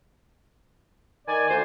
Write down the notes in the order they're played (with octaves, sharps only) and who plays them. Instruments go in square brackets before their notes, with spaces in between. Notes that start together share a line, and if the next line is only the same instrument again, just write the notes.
[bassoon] D#3 [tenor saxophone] D5 [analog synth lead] G#5
[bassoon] D2 [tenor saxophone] C5